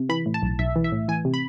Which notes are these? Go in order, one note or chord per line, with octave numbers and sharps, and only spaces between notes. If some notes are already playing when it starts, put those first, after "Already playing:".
Already playing: C3
E3 B5
A2
A5
B1
B1 E5
E3
E5
A2
E3 G#5
C3
B5